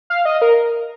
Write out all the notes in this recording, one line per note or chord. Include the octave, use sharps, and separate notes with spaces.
F5
D#5
A#4